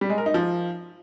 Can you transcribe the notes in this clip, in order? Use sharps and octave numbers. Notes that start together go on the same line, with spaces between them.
G3
G#3
A#4
D#4
F3